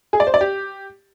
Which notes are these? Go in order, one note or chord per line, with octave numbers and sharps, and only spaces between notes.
G#4
D5
C5
D5
G4